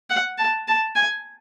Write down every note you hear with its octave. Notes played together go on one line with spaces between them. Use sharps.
F#5
A5
A5
G#5